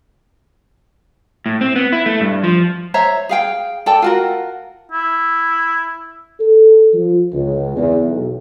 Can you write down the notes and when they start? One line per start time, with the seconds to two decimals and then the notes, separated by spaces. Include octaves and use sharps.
1.46 A2
1.61 C4
1.76 B3
1.92 E4
2.06 A3
2.21 G2
2.44 F3
2.94 C5 C#5 E5 A#5
3.29 G#4 F5 G5
3.86 A4 D5 G5 A5
4.02 F4 F#4 A#4
4.92 E4
6.40 A4
6.94 F3
7.33 C#2
7.76 E2
8.07 B1